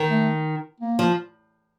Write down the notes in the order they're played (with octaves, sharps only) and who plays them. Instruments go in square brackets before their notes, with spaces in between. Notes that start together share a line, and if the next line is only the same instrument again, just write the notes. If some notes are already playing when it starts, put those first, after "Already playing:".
Already playing: [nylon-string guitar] D#3
[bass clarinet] A3
A#3
[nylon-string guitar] F3